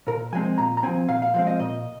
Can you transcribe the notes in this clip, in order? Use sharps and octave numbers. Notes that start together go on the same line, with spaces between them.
A#2 A#4
F3 G#3 C4 G#5
A#2 A#5
A#5
F3 G#3 C4 G#5
A#2 F5
F5
F3 G#3 C4 F5
D#5
A#2 D#5